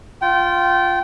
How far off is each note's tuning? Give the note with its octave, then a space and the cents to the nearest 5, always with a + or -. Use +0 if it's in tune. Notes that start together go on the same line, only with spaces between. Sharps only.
F4 +0 G5 -25